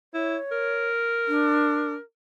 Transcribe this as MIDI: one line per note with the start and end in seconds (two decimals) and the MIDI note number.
0.14 0.37 64
0.14 0.88 73
0.52 2.01 70
1.28 1.94 62